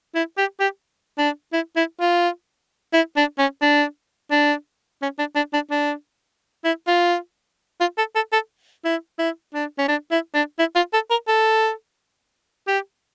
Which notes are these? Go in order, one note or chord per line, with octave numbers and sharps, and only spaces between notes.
E4
G4
G4
D4
E4
E4
F4
E4
D4
C#4
D4
D4
C#4
D4
D4
D4
D4
E4
F4
F4
A4
A4
A4
E4
E4
D4
C#4
D4
E4
D4
E4
F4
A4
A#4
A4
G4